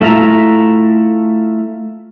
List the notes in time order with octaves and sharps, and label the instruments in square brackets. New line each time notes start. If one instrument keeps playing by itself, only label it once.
[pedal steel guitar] A3 E4 F4 E5 A#5